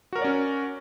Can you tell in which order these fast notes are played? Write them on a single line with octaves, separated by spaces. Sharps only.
F#4 A#4 C#5 D5 C#4